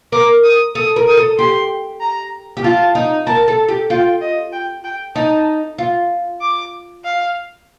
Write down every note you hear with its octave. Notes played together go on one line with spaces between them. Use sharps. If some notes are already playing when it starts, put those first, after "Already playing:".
A#4 D6
D#6
A4 D#6
A#4
D#6
A4
G4 C6
A#5
G4
F4 A5
D#4
A#4 A5
A4
G4
F4 G5
D#5
G5
G5
D#4 A5
F4
D6
F5